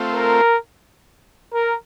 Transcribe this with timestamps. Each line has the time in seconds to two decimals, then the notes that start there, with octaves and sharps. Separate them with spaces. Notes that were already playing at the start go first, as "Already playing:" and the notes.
Already playing: A3 C4 F4
0.14 A#4
1.53 A#4